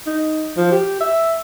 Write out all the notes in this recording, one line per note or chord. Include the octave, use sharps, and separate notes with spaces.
D#4
F3
G4
E5